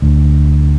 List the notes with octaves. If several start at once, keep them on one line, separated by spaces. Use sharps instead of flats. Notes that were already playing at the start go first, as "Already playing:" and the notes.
D2